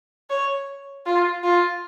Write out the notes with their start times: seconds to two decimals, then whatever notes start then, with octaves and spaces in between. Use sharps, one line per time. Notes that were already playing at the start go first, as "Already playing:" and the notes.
0.30 C#5
1.06 F4
1.43 F4